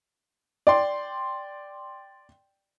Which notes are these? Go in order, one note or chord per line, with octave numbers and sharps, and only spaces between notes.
D5 G5 C6